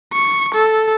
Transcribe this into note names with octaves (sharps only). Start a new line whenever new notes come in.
C#6
A4